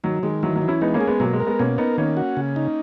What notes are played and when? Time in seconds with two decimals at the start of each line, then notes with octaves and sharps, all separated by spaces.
0.04 D#3 F#3
0.23 D#3 G#3
0.43 E3 F#3
0.56 F#3
0.62 E3
0.68 C#4 E4
0.81 G#3 B3 D#4
0.94 A#3 C#4
1.01 G#4
1.07 G#3 B3
1.20 B2 F#3 A#3
1.33 G#3
1.40 A#4
1.46 G#3 B3
1.59 B2 A#3 C#4
1.78 B3 D#4 A#4
1.98 D#3 A#3 C#4
2.17 F#4
2.37 C#3
2.56 D#4